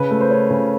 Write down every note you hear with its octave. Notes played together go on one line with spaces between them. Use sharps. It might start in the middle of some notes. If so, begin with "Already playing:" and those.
Already playing: C#3 B4
A3
C5
C#4
C#3